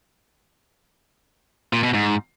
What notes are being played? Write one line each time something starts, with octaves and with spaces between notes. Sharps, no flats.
A#2
B2
G#2